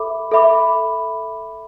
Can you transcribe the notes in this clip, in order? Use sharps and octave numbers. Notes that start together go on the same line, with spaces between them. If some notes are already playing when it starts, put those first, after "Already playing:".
Already playing: A4 E5 B5 D6
A4 E5 B5 D6